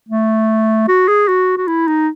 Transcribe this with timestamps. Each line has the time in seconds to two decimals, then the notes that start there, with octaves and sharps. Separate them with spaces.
0.09 A3
0.88 F#4
1.08 G#4
1.28 F#4
1.58 F#4
1.68 E4
1.88 D#4